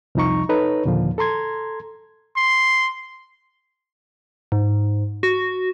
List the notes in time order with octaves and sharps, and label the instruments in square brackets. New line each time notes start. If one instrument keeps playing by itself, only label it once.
[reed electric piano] C2 F2 F3 D#4 A#5 C#6
D#4 A4 B4 C#5 A#5
D#2 A#2 D3 F3
A4 A#5 C6 G#6
[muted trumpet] C6
[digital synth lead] G#2
F#4